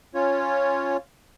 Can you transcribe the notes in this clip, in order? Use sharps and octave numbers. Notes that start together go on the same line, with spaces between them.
C#4 F4 C#5